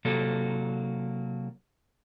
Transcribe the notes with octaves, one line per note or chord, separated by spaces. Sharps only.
C3 F#3 A#3 A4